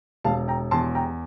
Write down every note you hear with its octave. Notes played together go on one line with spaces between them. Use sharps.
E1 F5 A5
G5 A#5
E2 A5 C6
G5 A#5